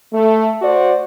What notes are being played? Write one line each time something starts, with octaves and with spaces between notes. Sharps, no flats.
A3
F#4 C5 D5